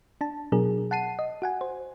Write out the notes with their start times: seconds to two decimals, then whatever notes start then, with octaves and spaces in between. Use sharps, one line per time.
0.21 D4 A5
0.52 B2 F#3 D4 G#4 A#4
0.91 F#5 A5 C7 D#7
1.19 D#5
1.42 F#4 F#5 G#5
1.61 C5